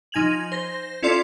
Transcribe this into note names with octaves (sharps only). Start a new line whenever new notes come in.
F3 D#4 G#5 G#6 F7 F#7
C5 A#6
C#4 E4 F4 A4 D5 C6